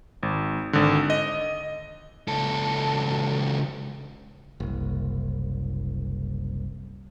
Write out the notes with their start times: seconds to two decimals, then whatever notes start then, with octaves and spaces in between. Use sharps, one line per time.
0.23 G#1
0.73 G#1 D3
1.10 D#5
2.28 C#2 A4
4.60 F#1 C2